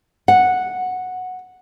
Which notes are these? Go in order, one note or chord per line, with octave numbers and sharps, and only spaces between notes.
F#5